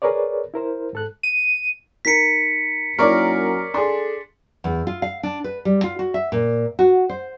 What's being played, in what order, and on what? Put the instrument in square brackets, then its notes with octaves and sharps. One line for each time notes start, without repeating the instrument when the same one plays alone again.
[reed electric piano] G#4 A#4 B4 C#5 D5
E4 A#4 C5
G#2 A4 F#6
[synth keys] D#7
[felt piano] D#4 A#4 A#5 [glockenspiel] B6 C#7
[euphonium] F#2 [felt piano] A#3 D#4 E4 [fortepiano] A#4 C#5 D5
[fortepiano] D4 G#4 [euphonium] A4 [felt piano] C6 A6
[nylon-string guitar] E2
F4
F5
D4
B4
G3
F4
F#4
E5
A#2
F#4
C5